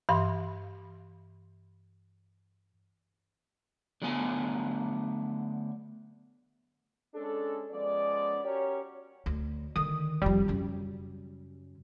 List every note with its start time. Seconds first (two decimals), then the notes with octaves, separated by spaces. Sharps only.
0.09 G2 E3 F5 C6
4.02 D3 F#3 A3 B3 G#5
7.15 G#3 C#4 D4 A4
7.71 F3 G#3 B3 C#4 D5
8.44 C#4 F#4 G4 A#4 C#5
9.26 D2
9.76 D3 D#3 D#6
10.22 F1 F3 G3
10.48 F#2 C#3